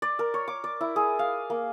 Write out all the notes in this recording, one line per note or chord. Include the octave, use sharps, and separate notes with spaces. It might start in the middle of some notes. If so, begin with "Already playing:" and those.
D5
A#4
C#5
D6
D5
E4
G#4
F5
A#3